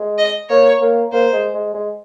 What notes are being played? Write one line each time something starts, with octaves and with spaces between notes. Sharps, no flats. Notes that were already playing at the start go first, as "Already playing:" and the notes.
Already playing: G#3
D#5
A#3 C#5
A#3
A#3 C5
G#3
G#3
G#3